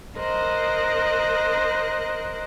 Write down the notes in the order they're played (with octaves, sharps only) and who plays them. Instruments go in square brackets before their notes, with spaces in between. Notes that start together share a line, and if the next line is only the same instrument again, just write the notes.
[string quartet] A#4 C5 D#5 F#6